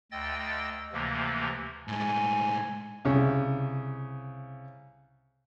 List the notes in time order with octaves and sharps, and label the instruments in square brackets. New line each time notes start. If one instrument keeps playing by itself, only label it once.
[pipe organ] D2 D#5 G5 E6 A6
D2 C3 E3 F3 A#3
[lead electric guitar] A2 G#3 [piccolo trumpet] G#5
[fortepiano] C2 C#3